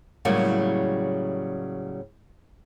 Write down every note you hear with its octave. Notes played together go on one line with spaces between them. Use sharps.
A2 C#3 F#3 G3 A#3